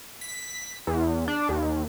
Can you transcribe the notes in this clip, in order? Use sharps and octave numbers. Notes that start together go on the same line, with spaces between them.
B6
E2
D4
D#2